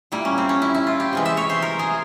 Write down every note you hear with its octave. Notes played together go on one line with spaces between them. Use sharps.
A#2 G3 A#3 E4
C#4
C4
C#4
E4
E4
F4
G4
C3 E3 G#3
E5
C#5
C5
A#4
G#4